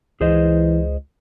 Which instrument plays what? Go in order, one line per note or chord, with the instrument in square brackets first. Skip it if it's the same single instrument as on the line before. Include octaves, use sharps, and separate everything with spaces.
[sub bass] C#2 [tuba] E3 [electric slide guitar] G#4 C5 D#5